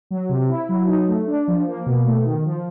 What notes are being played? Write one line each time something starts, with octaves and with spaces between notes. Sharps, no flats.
F#3
C3
E4
F#3
D#4
A3
D4
F3
A#3
B2
A3
D#3
F3